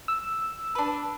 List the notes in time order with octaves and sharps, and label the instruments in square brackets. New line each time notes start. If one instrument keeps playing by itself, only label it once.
[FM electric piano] E6
[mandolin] D4 B4